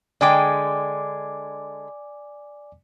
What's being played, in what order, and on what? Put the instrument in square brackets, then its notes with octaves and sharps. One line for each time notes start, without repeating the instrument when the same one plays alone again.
[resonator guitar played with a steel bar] D3 G#3 G5 [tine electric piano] D5 G#5 D6